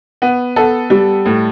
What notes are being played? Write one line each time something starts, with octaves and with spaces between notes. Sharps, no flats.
B3
B3 A4
G3
A2